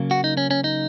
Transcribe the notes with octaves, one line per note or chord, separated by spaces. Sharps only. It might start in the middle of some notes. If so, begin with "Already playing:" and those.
Already playing: C#3 F#3 A#3
F#4
D#4
C#4
C#4
D#4